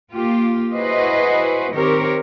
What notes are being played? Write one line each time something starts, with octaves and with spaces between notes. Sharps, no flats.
A#3 F4 G4
E4 F#4 G#4 B4 C5 D#5
D#3 C4 G4 A#4 C#5